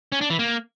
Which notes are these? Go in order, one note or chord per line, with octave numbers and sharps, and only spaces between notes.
C#4
D4
E3
A#3